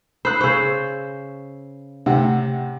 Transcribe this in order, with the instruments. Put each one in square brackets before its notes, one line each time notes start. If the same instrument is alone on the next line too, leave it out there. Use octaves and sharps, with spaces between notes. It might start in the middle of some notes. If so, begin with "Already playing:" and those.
[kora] C5 [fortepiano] B5 F#6
[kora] C#3 C5 [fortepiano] C#6 E6
[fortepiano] A2 C3 F#5